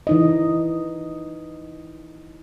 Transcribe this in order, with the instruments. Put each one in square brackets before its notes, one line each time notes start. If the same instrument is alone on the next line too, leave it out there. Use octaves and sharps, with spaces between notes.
[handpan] E3 D#4 D#5